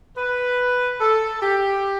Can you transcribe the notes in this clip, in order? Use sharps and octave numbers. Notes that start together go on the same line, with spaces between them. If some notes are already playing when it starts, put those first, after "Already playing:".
B4
A4
G4